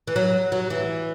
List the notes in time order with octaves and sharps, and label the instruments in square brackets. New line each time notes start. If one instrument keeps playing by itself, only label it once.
[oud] E3
F#3
F#3
E3